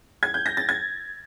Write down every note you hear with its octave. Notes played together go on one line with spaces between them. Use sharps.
G#6
G6
A#6
A6
G#6